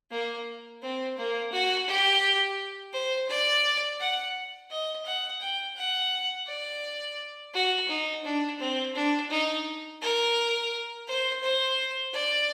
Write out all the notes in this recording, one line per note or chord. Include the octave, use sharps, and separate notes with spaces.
A#3
C4
A#3
F#4
G4
C5
D5
F#5
D#5
F#5
G5
F#5
D5
F#4
D#4
D4
C4
D4
D#4
A#4
C5
C5
D5